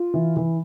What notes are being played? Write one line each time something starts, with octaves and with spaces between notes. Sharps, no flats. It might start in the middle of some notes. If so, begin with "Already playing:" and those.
Already playing: F4
E3
E3